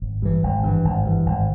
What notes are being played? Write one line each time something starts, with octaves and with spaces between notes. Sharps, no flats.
G#1
G2 E3
G#1
G2 E3
G#1
G2 E3
G#1